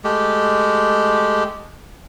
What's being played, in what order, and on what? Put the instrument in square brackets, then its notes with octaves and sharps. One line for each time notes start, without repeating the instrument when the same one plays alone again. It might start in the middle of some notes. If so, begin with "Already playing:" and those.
[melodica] G#3 A3 G4